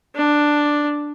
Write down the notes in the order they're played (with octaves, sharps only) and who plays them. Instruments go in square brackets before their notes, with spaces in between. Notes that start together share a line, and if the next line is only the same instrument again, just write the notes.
[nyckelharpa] D4